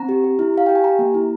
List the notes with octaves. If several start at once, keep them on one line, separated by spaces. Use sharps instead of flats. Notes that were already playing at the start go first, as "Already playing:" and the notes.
Already playing: C4 A#5
G4
G4
E4
G4 F5
G4 G5
G#5
G4 A#5
A#3
E4